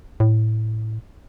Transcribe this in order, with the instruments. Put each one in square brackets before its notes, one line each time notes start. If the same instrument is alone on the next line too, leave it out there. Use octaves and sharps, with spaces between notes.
[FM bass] A2